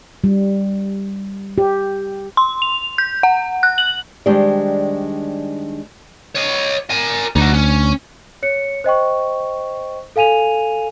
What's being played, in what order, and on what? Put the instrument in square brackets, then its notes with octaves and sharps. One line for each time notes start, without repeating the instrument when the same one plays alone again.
[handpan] G3
G4
[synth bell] C6
F7
G6
F#5
F#6
F#7
[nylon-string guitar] D#3 G3 G#3 D4 C5 D5
[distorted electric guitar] C#5 D#5
A#4 G#5
[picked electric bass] D2 [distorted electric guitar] D#4 F#4
[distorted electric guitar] C#4
[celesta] C#5 C#7
C5 D#5 G5 C#6
A4 F5 G#5 D#7 F7